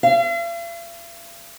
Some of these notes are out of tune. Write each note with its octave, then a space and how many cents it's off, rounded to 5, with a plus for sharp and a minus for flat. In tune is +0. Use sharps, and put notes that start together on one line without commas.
F5 -45